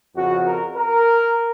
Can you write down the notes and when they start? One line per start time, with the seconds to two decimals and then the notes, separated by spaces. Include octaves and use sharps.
0.16 F2 C#3 F#4
0.46 A#4
0.76 A#4